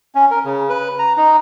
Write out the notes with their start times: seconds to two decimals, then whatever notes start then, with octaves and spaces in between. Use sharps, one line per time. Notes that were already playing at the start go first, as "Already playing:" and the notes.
0.15 C#4
0.31 A#4
0.44 C#3
0.69 B4
0.99 A#5
1.17 D#4